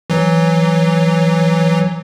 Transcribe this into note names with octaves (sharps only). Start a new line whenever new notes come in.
E3 F#3